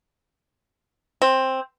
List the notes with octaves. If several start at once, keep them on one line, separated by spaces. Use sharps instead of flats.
C4